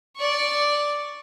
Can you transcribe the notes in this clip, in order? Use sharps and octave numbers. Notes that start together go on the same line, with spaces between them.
D5 C#6